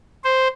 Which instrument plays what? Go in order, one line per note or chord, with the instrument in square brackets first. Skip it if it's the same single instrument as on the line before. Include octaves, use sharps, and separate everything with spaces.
[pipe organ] C5